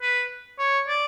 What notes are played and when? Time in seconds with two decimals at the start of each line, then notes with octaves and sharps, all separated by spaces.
0.02 B4
0.59 C#5
0.88 D5